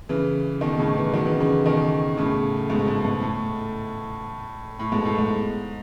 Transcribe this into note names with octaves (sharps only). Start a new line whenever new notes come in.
C#3 E3
B2 D#3
A2 C#3
C#3 E3
D#3 F#3
C#3 E3
C#3 E3
B2 D#3
A2 C#3
G#2 B2
G#2 B2
G#2 B2
A2
A2
G#2 B2
A2
G#2